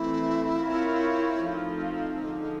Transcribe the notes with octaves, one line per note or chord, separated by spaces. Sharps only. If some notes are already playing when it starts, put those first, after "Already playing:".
Already playing: E3 A3 C4 E4
C4 F4 A#4 C#5
F3 A3 C4 D#4 E4 F4
D3 F3 G#3